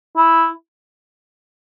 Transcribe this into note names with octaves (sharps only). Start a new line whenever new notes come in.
E4